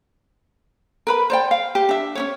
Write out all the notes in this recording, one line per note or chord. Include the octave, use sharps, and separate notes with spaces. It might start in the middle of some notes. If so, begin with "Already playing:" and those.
A#4 B4 B5
C5 D5 G5
F5
G4
D4 E5
C#4 D4 C#5